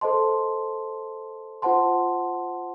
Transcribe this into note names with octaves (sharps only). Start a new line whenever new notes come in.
A4 C5 D#5 A5 C6
F4 C5 F#5 A5 C6